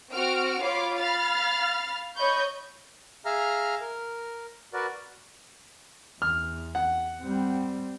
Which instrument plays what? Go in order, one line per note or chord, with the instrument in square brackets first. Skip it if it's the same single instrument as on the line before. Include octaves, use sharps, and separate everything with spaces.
[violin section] C4 F#4 F6 D7
F4 C#5 F5 B5 D6
F5 B5 F6 A6
C#5 D#5 B5 C#6 G6
[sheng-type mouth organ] G#4 E5 F5 A#5 F6
A#4
F#4 A#4 B4 D5
[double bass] E2 [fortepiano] F6
[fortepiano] F#5
[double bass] G3 C4